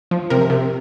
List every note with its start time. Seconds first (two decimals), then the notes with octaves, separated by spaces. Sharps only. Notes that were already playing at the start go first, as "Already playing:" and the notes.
0.11 F3
0.30 C3 A#4
0.50 C3